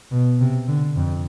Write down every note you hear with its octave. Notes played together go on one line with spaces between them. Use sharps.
B2
C3
D3
F2